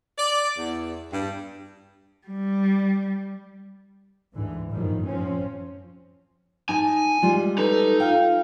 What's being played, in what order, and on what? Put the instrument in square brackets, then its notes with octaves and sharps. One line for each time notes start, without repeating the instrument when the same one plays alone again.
[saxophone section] D5
E2
G2
[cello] G3
[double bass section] D2 G#2 D3 E3
G1 F#2 A2 D#3 F3 G3
F3 C4 C#4
[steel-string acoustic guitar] D#4 A5 [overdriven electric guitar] G#5
[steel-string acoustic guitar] G3 G#3 F4
[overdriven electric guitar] D#4 [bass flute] A4 [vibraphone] B4
[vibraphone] F4 F5 [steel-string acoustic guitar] G5